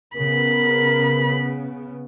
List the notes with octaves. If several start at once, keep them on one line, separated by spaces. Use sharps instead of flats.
C#3 B3 A#4 B5